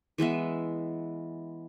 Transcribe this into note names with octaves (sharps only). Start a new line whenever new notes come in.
E3 G#3 B3 E5